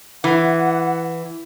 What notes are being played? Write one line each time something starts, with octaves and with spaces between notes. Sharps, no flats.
E3 F#5